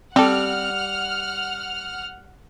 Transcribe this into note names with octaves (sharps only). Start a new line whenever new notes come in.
G3 C4 G4 A4 F#5 F6